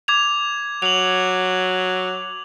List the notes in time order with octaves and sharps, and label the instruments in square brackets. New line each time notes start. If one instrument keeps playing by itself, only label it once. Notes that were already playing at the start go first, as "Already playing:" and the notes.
[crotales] D6 G#6 F7
[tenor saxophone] F#3 [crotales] F7 F#7